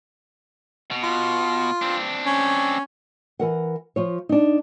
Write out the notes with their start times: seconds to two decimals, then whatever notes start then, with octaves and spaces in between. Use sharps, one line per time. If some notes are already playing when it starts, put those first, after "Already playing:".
0.91 B2
1.03 F4
1.82 C4 D4
2.26 C#4
3.39 E3 A#4 F#5
3.96 F3 F4 C#5
4.29 D4 D#4